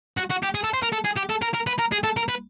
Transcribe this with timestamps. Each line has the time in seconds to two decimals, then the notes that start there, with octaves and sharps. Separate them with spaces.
0.17 F#4
0.30 F#4
0.43 G4
0.55 G#4
0.64 A4
0.74 C5
0.83 A#4
0.93 A4
1.05 G#4
1.17 G4
1.30 A4
1.42 A#4
1.54 A#4
1.67 B4
1.79 A#4
1.92 G#4
2.04 A4
2.17 A#4
2.29 B4